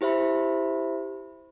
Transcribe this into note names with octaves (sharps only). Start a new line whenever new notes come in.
E4 G4 C5 E5 B5